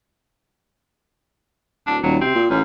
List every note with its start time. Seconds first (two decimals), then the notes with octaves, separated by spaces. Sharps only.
1.87 D1 D4
2.03 D#1 F#3
2.21 C3 C4
2.35 A#2
2.50 A1 F#2